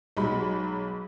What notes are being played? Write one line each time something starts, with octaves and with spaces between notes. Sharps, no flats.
B1 F#3 G#3 B5